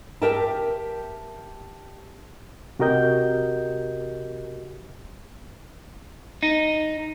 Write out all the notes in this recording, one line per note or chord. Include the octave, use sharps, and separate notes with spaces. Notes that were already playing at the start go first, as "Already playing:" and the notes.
G4 A#4 E5 G5 A5
C3 F#4 G4 A#4 D#5 G6
D#4